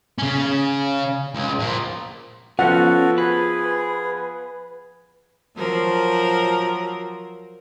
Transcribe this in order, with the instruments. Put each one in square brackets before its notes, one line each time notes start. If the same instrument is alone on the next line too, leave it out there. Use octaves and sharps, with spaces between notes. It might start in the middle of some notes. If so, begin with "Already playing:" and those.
[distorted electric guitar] C#3 C#4
C#2
A#2 F3
[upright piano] F3 B3 [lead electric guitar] C#4 [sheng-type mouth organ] F#4 A4 [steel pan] F#5
[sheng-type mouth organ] G#4 [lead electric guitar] B4
[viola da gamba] F3 F#3 A#4